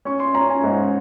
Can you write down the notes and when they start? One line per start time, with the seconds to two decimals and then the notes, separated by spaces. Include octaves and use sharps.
0.05 C#4 C#6
0.20 C6
0.34 C#4 A#5
0.50 G#5
0.64 G#2